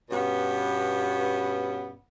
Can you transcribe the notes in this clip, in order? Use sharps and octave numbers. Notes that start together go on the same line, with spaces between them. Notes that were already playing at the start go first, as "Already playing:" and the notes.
G2 B2 B3 C#4